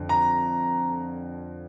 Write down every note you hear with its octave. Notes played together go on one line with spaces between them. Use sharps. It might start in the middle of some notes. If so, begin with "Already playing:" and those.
Already playing: F2 D3
A#5